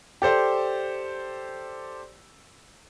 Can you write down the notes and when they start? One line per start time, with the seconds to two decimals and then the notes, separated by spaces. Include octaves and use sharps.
0.22 G4 A4 C5 D5